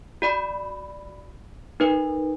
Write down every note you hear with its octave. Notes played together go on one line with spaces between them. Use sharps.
F#4 D5 B5
D#4 A#4 B4